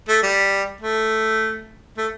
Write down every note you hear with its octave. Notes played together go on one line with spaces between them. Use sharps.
A3
G3
A3
A3